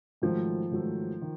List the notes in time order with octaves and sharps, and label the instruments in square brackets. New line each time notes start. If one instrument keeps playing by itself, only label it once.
[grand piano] G#2 D#3 F#3 A3 [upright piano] F3
[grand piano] G#2 D#3 F#3 A3
D#3